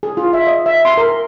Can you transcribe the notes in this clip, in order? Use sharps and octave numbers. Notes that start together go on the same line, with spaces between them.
G#4
F4
E5
D#5
E5
C6
A#4